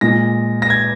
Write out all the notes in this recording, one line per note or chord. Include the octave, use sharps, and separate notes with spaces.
A#2 G#3 A#6
A#6
G#6